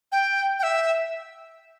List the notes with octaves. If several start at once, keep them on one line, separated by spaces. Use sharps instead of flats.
G5
G5
E5